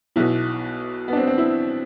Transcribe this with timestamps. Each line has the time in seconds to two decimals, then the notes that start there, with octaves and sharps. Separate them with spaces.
0.16 B1 B2 E4
1.08 B3
1.13 D4
1.17 C4
1.27 C4
1.38 E4